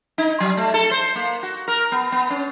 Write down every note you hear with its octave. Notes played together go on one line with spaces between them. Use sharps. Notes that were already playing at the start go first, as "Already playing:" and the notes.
D#4
F#3
A3
A4
C5
A#3
F#4
A#4
B3
B3
C#4